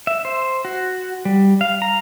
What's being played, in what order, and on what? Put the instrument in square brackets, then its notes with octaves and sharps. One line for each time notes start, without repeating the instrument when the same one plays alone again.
[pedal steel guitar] E5
C5
F#4
G3
F5
A#5